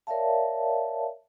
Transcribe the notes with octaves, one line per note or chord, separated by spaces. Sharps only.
A#4 C#5 D5 E5 F5 A5